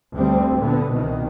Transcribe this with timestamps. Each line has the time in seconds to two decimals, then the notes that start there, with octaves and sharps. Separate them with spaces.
0.13 D2 G3 C4
0.58 A#2 D3 B3
0.91 C2 B2 D#3